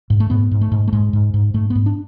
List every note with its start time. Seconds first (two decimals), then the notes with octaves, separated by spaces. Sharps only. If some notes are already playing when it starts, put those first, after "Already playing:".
0.10 G#2
0.20 A3
0.30 G#2 B3
0.51 G#2
0.61 A3
0.72 G#2
0.88 A3
0.93 G#2 G#3
1.13 G#2
1.34 G#2
1.54 G#2 A3
1.70 B3
1.75 G#2
1.86 D4